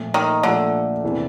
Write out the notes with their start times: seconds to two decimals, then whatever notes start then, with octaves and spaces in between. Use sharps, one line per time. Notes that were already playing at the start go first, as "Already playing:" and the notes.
Already playing: A#2 F3 A3
0.14 D#3
0.43 A#2 D3 F3 A3
1.03 E2 C3 E3